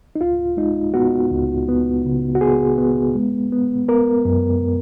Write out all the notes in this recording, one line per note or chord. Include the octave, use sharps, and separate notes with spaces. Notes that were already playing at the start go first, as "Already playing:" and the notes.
D#4
C#2 F4
G#3 D#4
B3 F#4
C#2
B3
C#3
F#4
B3 G#4
B3
G#3
B3
B3 A#4
F#2